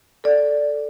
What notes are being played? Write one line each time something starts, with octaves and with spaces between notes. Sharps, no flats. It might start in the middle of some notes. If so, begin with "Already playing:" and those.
A4 D5